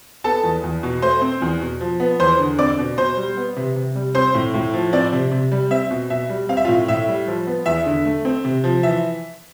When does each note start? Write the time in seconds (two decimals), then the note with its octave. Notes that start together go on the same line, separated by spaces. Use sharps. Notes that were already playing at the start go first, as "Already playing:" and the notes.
0.24 B3 A4 A5
0.44 E2
0.63 E2
0.83 B2
1.02 A3 C5 C6
1.22 C4
1.42 E2
1.61 B2
1.81 F3
2.00 B3
2.20 E2 C5 C6
2.39 D3
2.58 C4 D5 D6
2.78 B2
2.98 B2 C5 C6
3.17 G3
3.37 B3
3.56 C3
3.76 C3
3.95 G3
4.15 C4 C5 C6
4.34 A2
4.54 A2
4.74 F3
4.93 C4 D5
5.12 C3
5.31 C3
5.51 G3
5.71 C4 E5
5.90 B2
6.10 B2 E5
6.29 G3
6.49 C4 F5
6.57 E5
6.65 F4 F5
6.68 A2
6.88 A2 E5
7.08 G3
7.27 F3
7.47 B3
7.66 E2 E5
7.86 D3
8.05 A3
8.25 C4
8.45 C3
8.64 F3
8.83 E3 E5